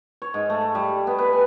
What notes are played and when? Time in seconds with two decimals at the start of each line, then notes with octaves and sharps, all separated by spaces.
0.22 C#5
0.34 G#2
0.50 A3
0.75 G3
1.07 B3
1.19 B4
1.33 G#5